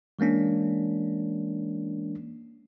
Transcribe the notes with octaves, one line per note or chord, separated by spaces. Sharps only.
E3 G#3 A#3 C#4 D4